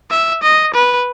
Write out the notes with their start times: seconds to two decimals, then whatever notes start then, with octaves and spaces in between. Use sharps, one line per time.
0.10 E5
0.43 D#5
0.74 B4